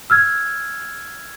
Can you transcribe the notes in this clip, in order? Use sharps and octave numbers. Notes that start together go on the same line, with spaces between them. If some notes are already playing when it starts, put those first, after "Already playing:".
E6 F6 G#6